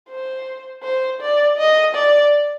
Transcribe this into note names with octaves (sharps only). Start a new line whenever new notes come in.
C5
C5
D5
D#5
D5